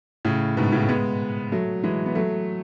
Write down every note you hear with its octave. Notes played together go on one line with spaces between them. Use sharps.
A2 C#3
G#2 B2
A2 C#3
G#3 B3
F#3 A3
E3 G#3
B3
F#3 A3